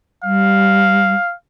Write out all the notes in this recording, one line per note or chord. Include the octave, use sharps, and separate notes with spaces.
G3 F5